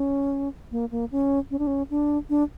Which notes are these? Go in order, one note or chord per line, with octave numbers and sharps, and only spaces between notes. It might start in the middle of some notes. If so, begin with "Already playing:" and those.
Already playing: C#4
A#3
A#3
C#4
C#4
D4
C#4
D4
D4